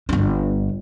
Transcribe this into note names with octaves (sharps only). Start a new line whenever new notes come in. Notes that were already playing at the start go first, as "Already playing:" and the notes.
G1 D4